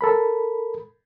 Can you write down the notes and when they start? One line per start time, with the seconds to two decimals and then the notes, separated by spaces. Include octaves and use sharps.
0.01 A4 A#4 B5